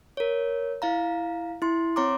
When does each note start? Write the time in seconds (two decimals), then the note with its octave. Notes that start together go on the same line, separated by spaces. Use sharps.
0.17 A#4 C#5
0.82 E4 F5 A#5
1.62 E4 C6
1.96 C4 C#5 A#5 C6 D6